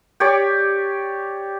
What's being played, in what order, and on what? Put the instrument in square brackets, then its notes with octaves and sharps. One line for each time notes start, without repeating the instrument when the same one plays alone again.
[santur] G4 C#5 D5 D6